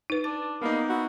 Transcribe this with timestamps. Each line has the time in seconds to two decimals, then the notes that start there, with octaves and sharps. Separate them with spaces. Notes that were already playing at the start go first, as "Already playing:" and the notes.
0.10 D#4 B4
0.24 D4 A6
0.61 G3 A#3 B3 D#4
0.89 E4 F#4